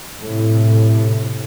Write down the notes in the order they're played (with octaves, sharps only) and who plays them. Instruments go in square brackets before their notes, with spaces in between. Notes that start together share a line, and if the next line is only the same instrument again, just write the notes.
[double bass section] A2 C3